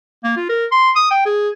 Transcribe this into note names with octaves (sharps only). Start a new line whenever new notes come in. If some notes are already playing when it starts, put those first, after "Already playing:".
A#3
F4
A#4
C6
D#6
G5
G#4